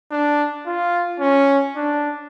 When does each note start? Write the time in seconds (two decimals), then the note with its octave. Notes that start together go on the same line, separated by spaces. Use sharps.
0.11 D4
0.67 F4
1.20 C#4
1.76 D4